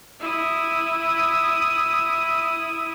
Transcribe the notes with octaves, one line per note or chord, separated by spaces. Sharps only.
E4 D#6